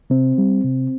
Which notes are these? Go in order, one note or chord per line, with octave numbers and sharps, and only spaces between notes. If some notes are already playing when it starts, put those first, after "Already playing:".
C3 C4
G3
C3